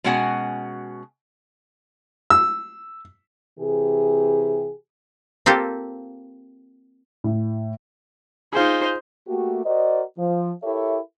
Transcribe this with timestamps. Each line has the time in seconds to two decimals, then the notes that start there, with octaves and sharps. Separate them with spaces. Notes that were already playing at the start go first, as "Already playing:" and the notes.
0.04 B2 G#3 C#4 F#4 F#5 G#5
2.30 E6
3.59 C3 E3 G4 G#4
5.46 A#3 C4 F4 G4 A4
7.24 A2
8.53 D#4 F4 G#4 C5
9.27 A3 A#3 F#4 G4
9.65 F#4 A#4 C5 D5 D#5
10.18 F3
10.63 E4 G4 A4 A#4 C#5 E5